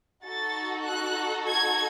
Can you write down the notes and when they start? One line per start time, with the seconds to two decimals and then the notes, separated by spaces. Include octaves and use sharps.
0.25 D#4 F#4 A4 A6
0.86 F#6
1.47 G#6